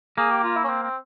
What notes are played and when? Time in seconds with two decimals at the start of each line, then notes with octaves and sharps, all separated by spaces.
0.18 A#3 G#4
0.31 G4
0.43 F4
0.56 E4
0.64 C#4
0.69 C4
0.82 C4